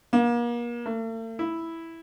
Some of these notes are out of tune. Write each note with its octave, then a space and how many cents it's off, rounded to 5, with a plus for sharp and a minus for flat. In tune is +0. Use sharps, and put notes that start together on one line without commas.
A#3 +35
A3 +45
E4 +0